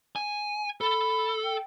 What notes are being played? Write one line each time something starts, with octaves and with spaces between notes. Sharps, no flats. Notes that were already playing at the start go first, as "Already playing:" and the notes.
G#5
A4 B5
G5